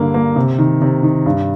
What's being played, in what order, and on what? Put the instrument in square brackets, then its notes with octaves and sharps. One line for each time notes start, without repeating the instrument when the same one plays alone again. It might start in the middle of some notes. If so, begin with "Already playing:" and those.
Already playing: [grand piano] G2 D3 A#3
A#3
C3
D#3
C3
D#3
G2